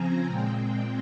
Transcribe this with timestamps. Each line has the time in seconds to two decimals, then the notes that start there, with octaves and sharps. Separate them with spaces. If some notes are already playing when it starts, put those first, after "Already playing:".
Already playing: C#3 F3 C4 G#5 A#5
0.26 A#2 G#3 C4 G5